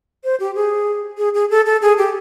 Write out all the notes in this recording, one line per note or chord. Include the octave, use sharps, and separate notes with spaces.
C5
G4
G#4
G#4
G#4
A4
A4
G#4
G4